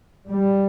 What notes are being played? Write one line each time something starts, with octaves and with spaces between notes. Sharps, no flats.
G3